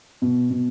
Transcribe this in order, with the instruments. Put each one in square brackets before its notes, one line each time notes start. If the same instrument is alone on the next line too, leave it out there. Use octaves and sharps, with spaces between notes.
[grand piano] B2
B2